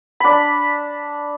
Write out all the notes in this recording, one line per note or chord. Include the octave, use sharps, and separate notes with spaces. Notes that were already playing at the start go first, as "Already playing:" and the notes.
D4 B5